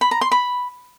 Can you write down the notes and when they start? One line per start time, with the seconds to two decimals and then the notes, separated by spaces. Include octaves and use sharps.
0.01 B5
0.11 A#5
0.21 C6
0.32 B5